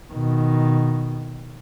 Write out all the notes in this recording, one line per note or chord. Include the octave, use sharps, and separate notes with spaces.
B2 D#3